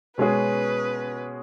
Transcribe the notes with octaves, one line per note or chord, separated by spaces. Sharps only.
B2 G#3 C#4 G#4 B4